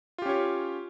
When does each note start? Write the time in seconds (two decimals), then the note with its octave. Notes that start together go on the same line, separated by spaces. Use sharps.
0.18 F4
0.22 G4
0.26 C#4
0.29 C#5